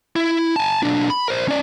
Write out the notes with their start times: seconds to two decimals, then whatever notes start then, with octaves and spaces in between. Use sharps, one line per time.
0.16 E4
0.56 G#5 A5
0.83 B1 D4
1.10 B5
1.28 A#4 C5
1.48 C#4 D5